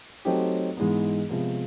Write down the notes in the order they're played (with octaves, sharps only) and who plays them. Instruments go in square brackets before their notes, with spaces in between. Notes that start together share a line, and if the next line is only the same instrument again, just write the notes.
[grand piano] F#3 A3 C4 D#4 G4
G#2 E3 G#3 B3
C3 F3 G#3 B3